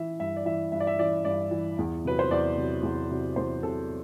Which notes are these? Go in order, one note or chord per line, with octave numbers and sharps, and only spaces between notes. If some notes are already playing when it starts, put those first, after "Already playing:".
Already playing: E3 E5
G2 E5
D5
E3 E5
G2 E5
D5
E5
E3 D5
G2 D5
E3
E2
C3 F#3 B4
C5
E2 D5
C3 F#3
E2
C3 F#3
E2 C5
C3 F#3 A4